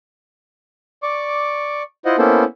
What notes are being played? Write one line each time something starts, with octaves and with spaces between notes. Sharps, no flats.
D5 C#6 D6
E4 F4 C5 D#5 F#5
A#3 B3 C#4 E4 A4 C5